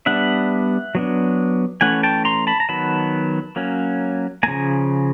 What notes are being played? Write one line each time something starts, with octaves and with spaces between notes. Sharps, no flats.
G3 B3 D4 E5 F#5
F#3 B3 D4
E3 A3 C#4 F#5 G#5
G5 A5
A#5 C6
A5 B5
A#5
D#3 F#3 B3 A5 B5
F#3 A#3 C#4
C#3 F3 A#3 G#5 A#5